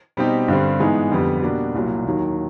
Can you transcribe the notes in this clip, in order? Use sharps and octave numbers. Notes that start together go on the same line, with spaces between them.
B2 G3 C4 D#4 G4
G2 D3 G3 C4
G#2 E3 G#3 B3 D#4
F2 D3 G3 B3
B2 G3 A#3 D4 F#4
C2 A#2 F#3
D#2 D#3 F#3